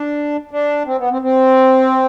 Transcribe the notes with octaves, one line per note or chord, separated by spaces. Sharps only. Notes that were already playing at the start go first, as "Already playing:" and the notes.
Already playing: D4
D4
C4
B3
C4
C4